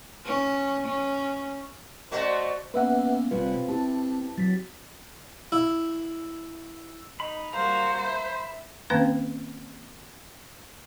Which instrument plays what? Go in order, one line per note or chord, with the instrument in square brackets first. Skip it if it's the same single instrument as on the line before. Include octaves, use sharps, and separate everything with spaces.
[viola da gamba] C#4
C#4
[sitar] A3 F#4 [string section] C5 D5 [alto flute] D#5
[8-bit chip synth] A#3 B3 C#4 [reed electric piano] B4 E5 F#5
[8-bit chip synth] G1 C3 G3 [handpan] C4 B4 [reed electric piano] F4
[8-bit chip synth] C4 [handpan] E4 G4 [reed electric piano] A5
[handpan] F#3 [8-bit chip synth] A6 B6
[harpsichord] E4
[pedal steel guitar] D#4 B5 [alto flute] D#5
[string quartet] G3 A#3 F#4 [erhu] C5 [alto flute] F5 [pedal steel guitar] A#5
[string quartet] E5 [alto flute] B5
[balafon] D#3 A#3 C4 C#4 B4 F5